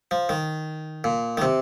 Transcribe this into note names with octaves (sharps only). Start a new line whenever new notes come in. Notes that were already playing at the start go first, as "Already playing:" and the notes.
F3
D#3
A#2
D#3
C3